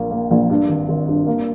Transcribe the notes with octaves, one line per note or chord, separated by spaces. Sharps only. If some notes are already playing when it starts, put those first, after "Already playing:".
Already playing: A#1 A#3
A#3
A#1
G2
G#1
G#1
G2
A#3